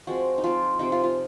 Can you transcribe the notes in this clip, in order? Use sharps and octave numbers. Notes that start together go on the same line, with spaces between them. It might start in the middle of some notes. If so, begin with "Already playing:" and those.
F3 G#3 C4 F#4
D#4
F3 C4 F4
C3 F3 G#3 C4 D#4
F4
F4